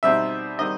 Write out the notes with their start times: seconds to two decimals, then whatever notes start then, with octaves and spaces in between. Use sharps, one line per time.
0.03 B2 G3 C4 D#4 E5
0.59 D#3 G3 C4 D#4 D#5